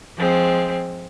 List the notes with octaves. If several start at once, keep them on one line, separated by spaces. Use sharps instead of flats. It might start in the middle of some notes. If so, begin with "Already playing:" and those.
F3 G#3 C4